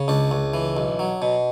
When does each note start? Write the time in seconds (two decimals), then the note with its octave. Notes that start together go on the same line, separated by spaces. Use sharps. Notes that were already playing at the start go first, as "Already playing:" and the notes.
Already playing: C#3
0.08 C#2 D4
0.31 C#2
0.54 E3
0.77 B1
0.99 F#3
1.22 B2